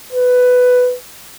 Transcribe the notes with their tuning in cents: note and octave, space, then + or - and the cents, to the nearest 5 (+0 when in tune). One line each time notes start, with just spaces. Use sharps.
B4 +10